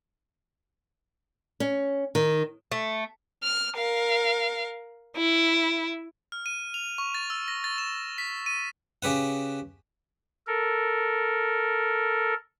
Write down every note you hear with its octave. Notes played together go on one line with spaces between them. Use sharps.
C#4
D#3
A3
F6
A#4 F5
E4
F6
D#7
F7
C#6
A6
E6
A#6
A6
E7
B6
D#7
C#3 G4 B4 F#5
A4 A#4